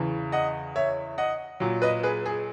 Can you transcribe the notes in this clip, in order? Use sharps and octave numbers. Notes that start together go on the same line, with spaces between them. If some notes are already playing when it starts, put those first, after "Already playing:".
Already playing: E2 C#3 E3
D#5 F#5
C#5 E5
D#5 F#5
A#2 F#3
B4 D#5
G#4 B4
G#4